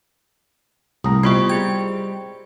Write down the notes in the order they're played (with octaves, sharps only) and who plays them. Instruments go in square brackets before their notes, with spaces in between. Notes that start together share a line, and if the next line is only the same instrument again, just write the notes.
[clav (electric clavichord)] C2 A#5 [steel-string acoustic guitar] A2 [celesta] D#6
[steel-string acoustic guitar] G3 C4 [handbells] B3 F4 D#5 [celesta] B5 C#6
[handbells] G#4 G#6 [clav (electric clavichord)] G5